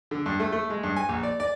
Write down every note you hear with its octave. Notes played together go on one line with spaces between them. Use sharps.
D3
G2
A3
A3
G#3
G2
G#5
A#1
D5
D5